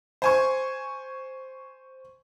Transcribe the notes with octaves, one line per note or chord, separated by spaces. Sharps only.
C5 G#5 C#6